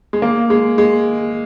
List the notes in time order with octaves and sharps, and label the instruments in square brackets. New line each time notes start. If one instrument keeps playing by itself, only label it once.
[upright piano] G#3
A#3
G#3
G#3